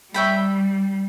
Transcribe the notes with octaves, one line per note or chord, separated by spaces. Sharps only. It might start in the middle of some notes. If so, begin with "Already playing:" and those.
G3 C#5 E5 G5 B5